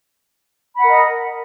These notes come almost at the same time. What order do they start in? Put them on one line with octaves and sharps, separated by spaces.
B5 F#5 A#4 D#5